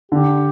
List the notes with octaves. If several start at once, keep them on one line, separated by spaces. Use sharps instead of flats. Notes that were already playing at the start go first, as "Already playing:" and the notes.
D3 G4